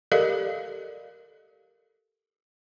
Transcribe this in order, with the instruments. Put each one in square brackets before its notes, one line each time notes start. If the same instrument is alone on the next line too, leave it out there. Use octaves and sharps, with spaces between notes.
[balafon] G4 A4 A#4 D5 D#5 F5